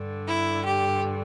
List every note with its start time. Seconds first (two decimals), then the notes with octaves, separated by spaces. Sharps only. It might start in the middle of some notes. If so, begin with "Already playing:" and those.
Already playing: G2 D3
0.27 E4
0.65 G4